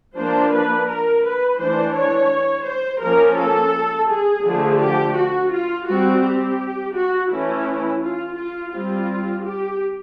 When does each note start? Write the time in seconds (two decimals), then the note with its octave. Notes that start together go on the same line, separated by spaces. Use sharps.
0.17 F3 A#3 D4 C5
0.53 B4
0.88 A#4
1.24 B4
1.60 E3 A3 D4 C5
1.96 C#5
2.67 C5
3.02 F3 A#3 C#4 A#4
3.38 A4
4.10 G#4
4.45 D3 F3 A3
4.81 G4
5.17 F#4
5.52 F4
5.87 G3 C4 F#4
6.24 G4
6.95 F#4
7.30 E3 A3 C#4 E4
8.02 F4
8.38 F4
8.73 G3 C4 F4
9.44 G4